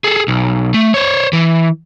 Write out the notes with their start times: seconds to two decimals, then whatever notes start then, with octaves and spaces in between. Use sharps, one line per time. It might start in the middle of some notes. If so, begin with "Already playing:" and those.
0.04 G#4 A4
0.28 B1
0.74 A3
0.94 C5 C#5
1.33 E3